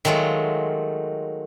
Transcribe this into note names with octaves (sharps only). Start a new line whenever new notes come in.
D#3 F#3 G#3 A3 F4